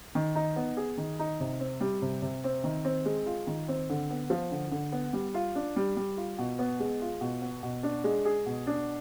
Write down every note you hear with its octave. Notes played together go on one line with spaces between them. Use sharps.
D#3
D#4
B3
G#4
D#3
D#4
C3
C4
G3
C3
C3
C4
D#3
C4
G#3
F4
D#3
C4
D3
B3
F3
D3
D3
B3
G3
F4
D4
G3
G3
F4
B2
B3
G#3
F4
B2
B3
B2
D4
G#3
G#4
B2
D4